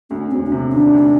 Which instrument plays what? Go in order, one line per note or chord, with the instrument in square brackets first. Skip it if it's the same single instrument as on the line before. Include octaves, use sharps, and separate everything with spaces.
[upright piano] D2 [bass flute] C#4
[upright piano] E1 [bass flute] C4
[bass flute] D4
[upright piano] C3 [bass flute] C#4
[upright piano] D#3 [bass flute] D4
[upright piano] D2